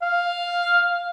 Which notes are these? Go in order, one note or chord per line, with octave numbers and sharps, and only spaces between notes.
F5